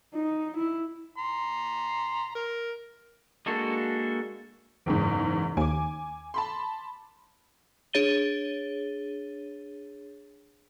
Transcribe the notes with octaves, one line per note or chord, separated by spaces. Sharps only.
D#4
E4
A#5 C6
A#4
G#3 A#3 D4 F#4 A4
F#1 E2 G#2
D#2 G#5 D6
A5 B5 C6
D4 G#4 C#5 A6 D#7 G7